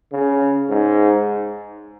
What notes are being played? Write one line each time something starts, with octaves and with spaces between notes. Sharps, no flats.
C#3
G#2